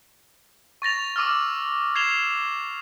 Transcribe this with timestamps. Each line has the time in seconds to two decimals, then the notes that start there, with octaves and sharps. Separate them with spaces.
0.82 C#6 A6 A#6 F7
1.16 C#6 D6 E6 F6
1.95 G#6 C7 E7 F7 G7